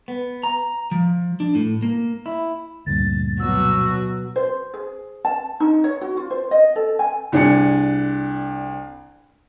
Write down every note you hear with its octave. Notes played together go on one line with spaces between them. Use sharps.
B3
A#5
F3
D4
A2
A#3
E4
D2 G2 A#2 A6
B2 F#3 F#4 E6
C5
G#4
A5
D#4
C#5
F#4
F4
C5
D#5
A4
G#5
C2 D4 G#4 C#7